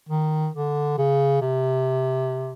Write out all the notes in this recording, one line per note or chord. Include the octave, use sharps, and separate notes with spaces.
D#3
D3
C#3
C3